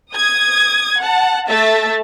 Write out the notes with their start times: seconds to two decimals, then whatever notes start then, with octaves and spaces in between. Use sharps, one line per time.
0.13 D#6 G#6
0.99 F#5 A5
1.48 A3 E5 A6